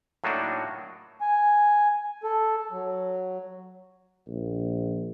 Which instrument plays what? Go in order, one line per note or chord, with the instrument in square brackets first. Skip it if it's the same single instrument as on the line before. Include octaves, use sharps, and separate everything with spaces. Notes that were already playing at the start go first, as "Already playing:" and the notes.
[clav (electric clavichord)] A2 F#3 A#3 D4 D#4 F#4
[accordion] G#5
A4
F#3
[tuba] A#1